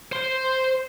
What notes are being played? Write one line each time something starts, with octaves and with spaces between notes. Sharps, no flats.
C5 C6